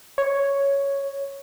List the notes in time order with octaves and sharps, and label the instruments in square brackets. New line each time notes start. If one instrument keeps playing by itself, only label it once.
[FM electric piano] C#5